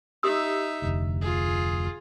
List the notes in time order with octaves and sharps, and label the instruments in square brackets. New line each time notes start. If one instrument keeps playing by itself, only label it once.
[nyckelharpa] D#4 E5 [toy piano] G4 D#6 E6
[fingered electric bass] F1 D2
[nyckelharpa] F4 G#4